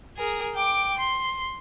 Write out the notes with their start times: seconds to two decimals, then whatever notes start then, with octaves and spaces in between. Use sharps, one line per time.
0.18 G#4 A#4
0.55 G5 D6
0.98 C6